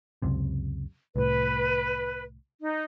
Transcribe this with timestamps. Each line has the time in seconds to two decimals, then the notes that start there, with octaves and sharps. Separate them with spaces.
0.22 C#2 F#2 C3
1.16 C2 A2 B4
2.60 D#4